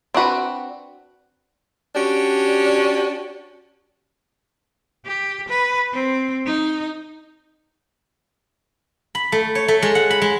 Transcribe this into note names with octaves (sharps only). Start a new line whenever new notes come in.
C4 D4 F#4 B4
C#4 D4 F#4 G4
G4
B4
C4
D#4
B5
A3
C#5
A3
G#3
F#5
B5
G#3